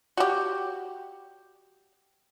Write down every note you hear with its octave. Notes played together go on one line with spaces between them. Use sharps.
F#4 G4